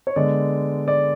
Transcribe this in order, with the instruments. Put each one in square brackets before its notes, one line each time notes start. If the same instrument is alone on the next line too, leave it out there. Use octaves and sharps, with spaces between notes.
[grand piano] C#5
D3 G#3 B3 D5
D5